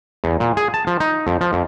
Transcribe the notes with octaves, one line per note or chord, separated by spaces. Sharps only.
E2
A#2
G#4
A5
F3
D#4
F2
F3
F2